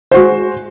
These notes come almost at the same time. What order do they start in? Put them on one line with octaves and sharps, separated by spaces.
C5 F#4 G#3